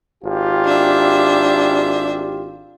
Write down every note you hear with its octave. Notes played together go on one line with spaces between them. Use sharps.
G#1 F4 G4
D4 E5